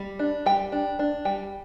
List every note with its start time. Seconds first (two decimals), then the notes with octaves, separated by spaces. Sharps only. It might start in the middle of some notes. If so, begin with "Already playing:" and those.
Already playing: G3
0.19 D4
0.46 G3 G5
0.72 D4
0.99 D4
1.25 G3 G5